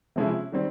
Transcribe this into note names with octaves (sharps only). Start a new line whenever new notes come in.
C3 F3 G#3 C#4 E4
D#3 G3 C4